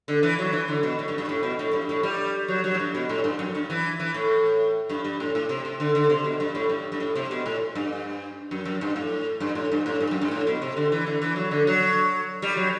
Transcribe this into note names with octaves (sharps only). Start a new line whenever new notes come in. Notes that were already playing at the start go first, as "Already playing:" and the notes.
D3
E3
F#3
E3
D3
B2
A2
G2
G2
A2
B2
A2
G2
A2
G3
F#3
F#3
A2
G2
B2
A2
G2
F#2
G2
E3
E3
A2
G2
G2
A2
A2
C3
C3
D3
D3
C3
B2
G2
A2
G2
G2
A2
C3
B2
A2
G2
F#2
F#2
G2
A2
G2
A2
G2
A2
G2
F#2
G2
A2
B2
C3
D3
E3
D3
E3
F#3
D3
F#3
G3
F#3